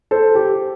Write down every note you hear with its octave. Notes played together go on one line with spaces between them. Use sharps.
A4 C5
G4